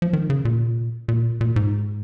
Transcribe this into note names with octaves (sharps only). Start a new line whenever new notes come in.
F3
D#3
C#3
A#2
A#2
A#2
G#2